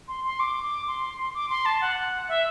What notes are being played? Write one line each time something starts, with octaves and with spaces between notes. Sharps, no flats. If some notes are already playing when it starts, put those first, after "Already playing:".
C6
C6
D6
C6
D6
C6
A5
F#5
E5